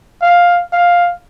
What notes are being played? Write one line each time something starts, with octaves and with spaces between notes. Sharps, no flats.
F5
F5